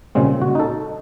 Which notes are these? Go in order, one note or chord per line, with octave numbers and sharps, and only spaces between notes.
A#2 C#3 G3 G#3 C4
F#4
D#4 A4